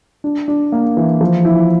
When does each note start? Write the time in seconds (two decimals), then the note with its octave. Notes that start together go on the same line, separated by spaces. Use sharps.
0.24 D4
0.48 D4
0.72 A#3
0.97 E3
1.21 F3
1.45 E4